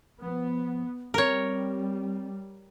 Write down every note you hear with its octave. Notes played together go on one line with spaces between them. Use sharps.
F3 B3
G3 C4 A#4 C#5